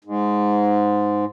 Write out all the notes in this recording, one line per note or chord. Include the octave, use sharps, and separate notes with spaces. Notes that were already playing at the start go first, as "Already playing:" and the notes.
G#2